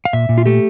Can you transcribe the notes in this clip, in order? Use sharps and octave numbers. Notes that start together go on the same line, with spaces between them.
F5
A#2 E5
A#2
F4
A3 G4